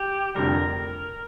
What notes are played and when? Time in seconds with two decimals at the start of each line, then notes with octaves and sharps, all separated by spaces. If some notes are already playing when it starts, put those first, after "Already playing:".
Already playing: G4
0.35 F1 F2 D3 G3 A#4